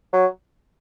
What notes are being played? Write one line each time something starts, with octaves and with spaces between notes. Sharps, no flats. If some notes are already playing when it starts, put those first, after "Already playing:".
F#3